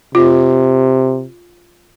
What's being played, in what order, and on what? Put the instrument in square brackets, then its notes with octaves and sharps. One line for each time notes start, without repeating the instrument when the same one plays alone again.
[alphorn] C3 [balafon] F4